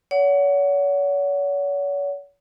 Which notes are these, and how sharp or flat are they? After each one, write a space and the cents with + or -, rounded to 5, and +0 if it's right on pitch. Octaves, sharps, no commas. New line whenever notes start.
C#5 +40 F#5 +0